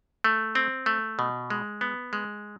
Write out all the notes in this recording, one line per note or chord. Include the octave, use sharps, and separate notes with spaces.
A3
C4
A3
B2
G#3
B3
G#3